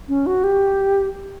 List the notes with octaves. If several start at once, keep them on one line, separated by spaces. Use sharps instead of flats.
C#4
F#4
G4